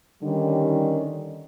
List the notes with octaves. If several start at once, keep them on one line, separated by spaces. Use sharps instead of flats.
D3 D#3 G3 C#4 D#4